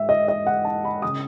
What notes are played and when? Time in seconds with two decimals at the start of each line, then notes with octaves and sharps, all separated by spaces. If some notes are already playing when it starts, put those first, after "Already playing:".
Already playing: G#2 E5
0.09 D#5
0.28 D#5
0.47 F#5
0.65 A5
0.85 B5
1.02 C#3 D#6